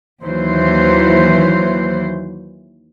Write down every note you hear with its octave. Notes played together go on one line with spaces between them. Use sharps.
D#2 E3 F#3 C5